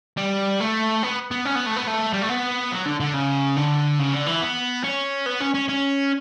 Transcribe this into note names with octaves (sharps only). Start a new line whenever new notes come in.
G3
A3
B3
B3
C#4
B3
A3
B3
A3
G3
A3
B3
F#3
D3
D3
C#3
D3
C#3
D3
E3
B3
C#4
B3
C#4
C#4
C#4